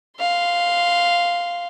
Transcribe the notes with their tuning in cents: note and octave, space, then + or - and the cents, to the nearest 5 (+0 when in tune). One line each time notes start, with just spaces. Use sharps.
F5 +0 C6 -10